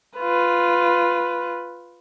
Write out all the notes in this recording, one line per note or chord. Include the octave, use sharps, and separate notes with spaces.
F4 B4